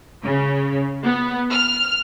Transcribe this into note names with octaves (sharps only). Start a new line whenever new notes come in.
C#3
B3
F6